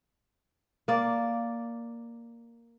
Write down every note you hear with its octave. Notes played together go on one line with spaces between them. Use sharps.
A#3 D5